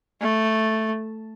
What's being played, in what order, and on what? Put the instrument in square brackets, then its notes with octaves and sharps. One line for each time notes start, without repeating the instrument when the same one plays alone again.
[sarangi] A3